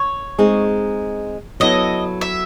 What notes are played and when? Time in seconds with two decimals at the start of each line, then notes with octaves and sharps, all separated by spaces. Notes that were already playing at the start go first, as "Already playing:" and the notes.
Already playing: C#5
0.39 G#3 C4 D#4 G#4
1.60 F#3 B3 E4 A4 D#5
2.21 E5